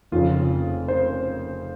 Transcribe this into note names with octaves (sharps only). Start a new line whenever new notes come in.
F1 F2 C#3 F4
C5